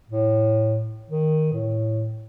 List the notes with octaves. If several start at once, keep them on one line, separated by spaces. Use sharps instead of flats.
A2
D#3
A2